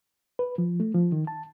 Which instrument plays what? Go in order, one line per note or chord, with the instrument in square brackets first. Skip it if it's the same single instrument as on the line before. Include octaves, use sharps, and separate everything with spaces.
[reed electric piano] B4
F3
A3
F3
D#3
A5